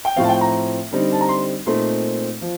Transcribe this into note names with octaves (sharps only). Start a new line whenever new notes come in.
G5
A2 F3 C4 F5
A5
G5
A#5
D3 G3 C4 D#4
A5
A#5
C6
A#2 A3 C4 D#4 C6
F3